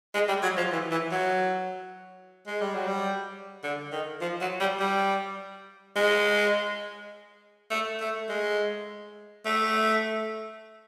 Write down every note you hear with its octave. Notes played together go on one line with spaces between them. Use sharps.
G#3
G3
F#3
F3
E3
E3
F#3
G#3
G3
F#3
G3
D3
D#3
F3
F#3
G3
G3
G#3
A3
A3
G#3
A3